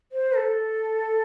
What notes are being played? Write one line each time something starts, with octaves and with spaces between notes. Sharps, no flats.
C5
A4